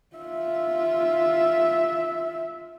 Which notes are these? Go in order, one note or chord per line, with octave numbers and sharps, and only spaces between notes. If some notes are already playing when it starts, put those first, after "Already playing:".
F4 E5